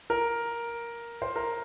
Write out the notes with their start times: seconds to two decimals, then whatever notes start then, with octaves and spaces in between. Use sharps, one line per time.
0.10 A#4
1.22 C5
1.36 A#4